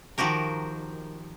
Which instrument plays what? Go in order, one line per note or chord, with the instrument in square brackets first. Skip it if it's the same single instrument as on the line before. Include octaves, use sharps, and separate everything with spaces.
[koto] D#3 F3 F#4 G4 A#4